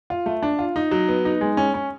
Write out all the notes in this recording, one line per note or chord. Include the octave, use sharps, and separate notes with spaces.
F4
A3
D4
F4
D#4
F#3
B3
D#4
G#3
C#4
C#4